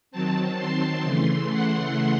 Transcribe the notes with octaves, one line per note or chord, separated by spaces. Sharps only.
D#3 F#3 C4 A5
C6
C#3 E3 A3
F#5